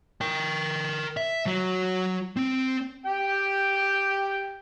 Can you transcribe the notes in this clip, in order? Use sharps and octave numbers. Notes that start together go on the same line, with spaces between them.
A#4 G5
E5
F#3 F#4
C4
G4 G5